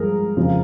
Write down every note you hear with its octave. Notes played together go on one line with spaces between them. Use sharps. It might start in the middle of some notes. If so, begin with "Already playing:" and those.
Already playing: G2 F3 G#3 G#4 A#4
F2 C#3 F3